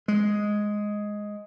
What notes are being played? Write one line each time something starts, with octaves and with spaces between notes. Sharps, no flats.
G#3